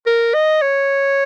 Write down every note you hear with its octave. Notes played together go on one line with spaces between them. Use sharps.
A#4
D#5
C#5